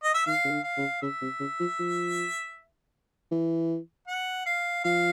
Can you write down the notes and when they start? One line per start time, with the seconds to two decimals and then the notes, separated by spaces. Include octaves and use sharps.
0.03 D#5
0.14 E5
0.26 D#3 F5
0.45 C#3
0.51 D3
0.64 F5
0.77 C#3
1.02 C#3 E5
1.22 C3
1.40 C#3
1.60 F3
1.79 F3
3.31 E3
4.08 F#5
4.46 F5
4.84 F3 F5